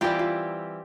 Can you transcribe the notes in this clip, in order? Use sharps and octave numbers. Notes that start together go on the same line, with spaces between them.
E3 G3 C4 E4 F4 G4
F4